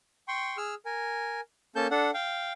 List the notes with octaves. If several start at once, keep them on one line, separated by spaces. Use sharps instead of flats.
G5 C6 C#6
G#4 E6 F6
A#4 G#5
A#3 C#4 A4 A5 G6
D4 A4 F#5
F5 G5